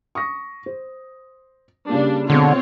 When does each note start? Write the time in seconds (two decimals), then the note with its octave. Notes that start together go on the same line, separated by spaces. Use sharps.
0.15 C#6 D#6 A#6
0.66 C5
1.89 C#3 G3 A#3 D4
2.30 B2 D3 G#3 C4 F4 C#5